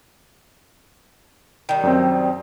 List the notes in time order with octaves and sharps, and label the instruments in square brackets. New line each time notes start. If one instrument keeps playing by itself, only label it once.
[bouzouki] D#3 G3
[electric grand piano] F#2 C4